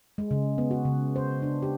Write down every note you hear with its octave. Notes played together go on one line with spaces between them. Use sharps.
G#3
C#3
B3
F#4
C#3
C5
D4
G4